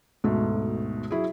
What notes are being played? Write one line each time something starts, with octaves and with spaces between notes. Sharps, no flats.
D2 G#2 B2 A3
F#3 E4 G#4